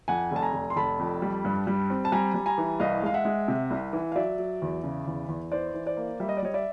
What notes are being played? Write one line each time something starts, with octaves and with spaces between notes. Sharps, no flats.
F2 F#5 G#5
F1 A5
G#5 A#5
F1
C6
F1 A5 B5
F2
G3
G2
G3
C4
A5
G3 G#5 A#5
G3
G#5 A#5
E3
C2 D#5 F5
G#3 F5
E5 F#5
G#3
C3
C2
E3
F5
F#3 D5 E5
F#3
E2
C#3
E2
E2
E3 C5 D5
E3
C5 D5
A#3
G3 E5
D#5
D5
G3 C#5 D#5
D5 E5